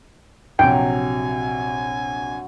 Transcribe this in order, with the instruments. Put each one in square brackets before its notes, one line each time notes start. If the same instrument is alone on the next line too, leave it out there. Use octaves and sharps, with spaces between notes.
[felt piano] A#1 C3 [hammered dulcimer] F#3 [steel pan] G5 [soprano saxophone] G#5